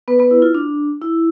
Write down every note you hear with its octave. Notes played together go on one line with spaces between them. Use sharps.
B3 B4
B3 B4
E4
F4
D4
E4